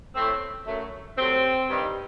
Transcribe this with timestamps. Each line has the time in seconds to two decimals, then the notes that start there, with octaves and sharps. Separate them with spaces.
0.15 A2 A3 C4
0.67 F#2 F#3 A3
1.17 C3 F#3 A3 C4
1.69 G2 D#3 G3